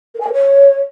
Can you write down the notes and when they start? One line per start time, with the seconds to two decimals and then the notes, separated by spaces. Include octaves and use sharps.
0.15 A#4
0.21 G#5
0.27 A#4
0.33 C#5